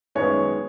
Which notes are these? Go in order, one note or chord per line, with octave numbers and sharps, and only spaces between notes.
F#2 D#3 G#3 B3 C#5